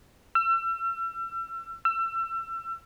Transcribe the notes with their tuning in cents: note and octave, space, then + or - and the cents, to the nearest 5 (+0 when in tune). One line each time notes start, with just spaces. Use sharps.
E6 +35
E6 +30